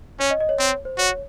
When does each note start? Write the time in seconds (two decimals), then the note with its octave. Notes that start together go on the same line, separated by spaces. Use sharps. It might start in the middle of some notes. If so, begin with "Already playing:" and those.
0.20 C#4 C#5
0.30 D#5
0.40 D#5
0.49 C#5
0.59 C4 C#5
0.85 C5
0.98 F#4 C#5